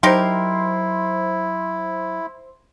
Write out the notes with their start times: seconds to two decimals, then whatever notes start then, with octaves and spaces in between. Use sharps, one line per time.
0.03 F#3 D#4 E4 G4 A#4 C5 C6